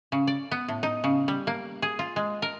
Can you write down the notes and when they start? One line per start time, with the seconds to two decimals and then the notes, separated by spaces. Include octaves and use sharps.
0.12 C#3
0.27 D5
0.51 B3
0.68 A2
0.83 D#4
1.04 C#3
1.28 G3
1.47 A#3
1.82 G#4
1.99 F4
2.16 G#3
2.42 A#4